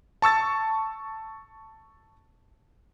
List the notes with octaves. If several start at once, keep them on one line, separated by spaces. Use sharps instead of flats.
A5 C#6 E6 A6